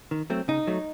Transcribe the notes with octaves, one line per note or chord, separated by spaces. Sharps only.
D#3
F#3 A3 C4
C#3 D#4
F#3 A3